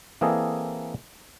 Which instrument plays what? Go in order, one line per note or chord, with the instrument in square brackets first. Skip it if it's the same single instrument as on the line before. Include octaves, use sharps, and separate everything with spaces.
[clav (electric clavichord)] E3 A#3 C4 G#4 A4 D#5